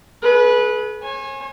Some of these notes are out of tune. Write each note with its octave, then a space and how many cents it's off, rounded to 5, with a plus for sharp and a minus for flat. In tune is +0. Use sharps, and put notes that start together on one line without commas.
G#4 +40 B4 -15
C#5 -40 G#5 +0